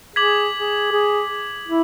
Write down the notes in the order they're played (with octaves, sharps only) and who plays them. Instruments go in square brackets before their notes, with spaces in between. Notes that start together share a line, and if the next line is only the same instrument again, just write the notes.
[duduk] G#4 [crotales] D6 G#6 B6 F#7
[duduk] G#4
G#4
E4